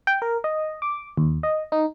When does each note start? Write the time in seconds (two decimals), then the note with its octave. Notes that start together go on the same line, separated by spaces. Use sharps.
0.07 G5
0.22 A#4
0.44 D#5
0.82 D6
1.17 D#2
1.43 D#5
1.72 D#4